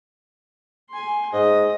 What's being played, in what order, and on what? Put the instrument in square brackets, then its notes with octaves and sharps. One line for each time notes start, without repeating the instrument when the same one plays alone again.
[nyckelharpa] G#5 C6
[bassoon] G#2 [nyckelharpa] D#5